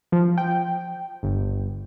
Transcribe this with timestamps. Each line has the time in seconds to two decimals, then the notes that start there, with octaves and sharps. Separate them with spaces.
0.12 F3
0.38 G5
1.23 G1